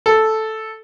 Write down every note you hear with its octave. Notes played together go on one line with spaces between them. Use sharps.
A4